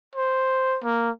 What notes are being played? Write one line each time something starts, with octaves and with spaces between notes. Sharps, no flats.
C5
A#3